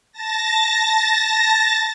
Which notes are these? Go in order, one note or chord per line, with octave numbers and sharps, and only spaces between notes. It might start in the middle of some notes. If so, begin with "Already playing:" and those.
A5 A6 A#6